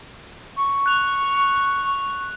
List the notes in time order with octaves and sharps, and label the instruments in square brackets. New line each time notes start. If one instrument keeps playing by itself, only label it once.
[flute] C#6
[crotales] F#6 F7